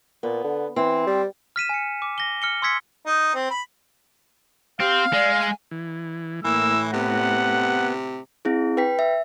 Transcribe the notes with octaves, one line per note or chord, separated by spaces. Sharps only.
A#2 B3
D3
E3 C4
G3
F6 B6 D#7 E7
G#5 C#7
D6
A#6 G7
F6 C#7 G7
C6 D6 E6 G#6 B6 C#7
D#4
C4
B5
C4 G4 F5
G#3 D5
G#5
E3
A2 E3 A#3 E6
C3 B3 F#5
C4 E4 G#4
B4 G5 B6
E5